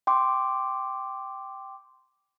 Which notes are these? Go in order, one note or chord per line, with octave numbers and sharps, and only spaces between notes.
G5 C6 D6